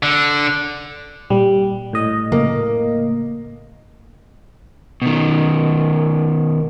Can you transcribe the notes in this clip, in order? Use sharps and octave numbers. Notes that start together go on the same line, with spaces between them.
D3
A#2 G3
A2 D#5
C#3 A#3
B2 D#3